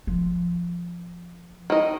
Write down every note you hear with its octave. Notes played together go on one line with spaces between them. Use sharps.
F3
D#3 D#5